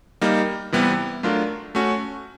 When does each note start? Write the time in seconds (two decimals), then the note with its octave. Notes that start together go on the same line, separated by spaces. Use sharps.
0.21 G3 A#3 D#4
0.72 C3 E3 G3 B3 E4
1.23 F#3 A3 D4 F4 A#4
1.75 A3 C#4 F#4